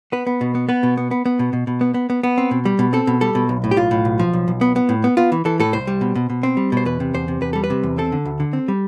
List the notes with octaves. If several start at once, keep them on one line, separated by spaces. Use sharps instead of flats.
B3 B4
B3
B2
B3
B3 B4
B2
B3
B3
B3
B2
B2
B2
B3
B3
B3
B3
C4
B2
G3
B2
C4 A4
B2
G3 A4
B2
B1
A2
G4
B1 F4
A2
B1
F3
B1
B1
B3
B3
A2
B3
B3 F4
E3
E3 A4
A2 A4
C2 C5
G3
B2
B2
B2
C4
G3
B2 C5
E2 B4
C3
E2 C5
C3
E2 B4
G3 A4
B4
C3
E2
C4 A4
D3
D2
D3
C4
G3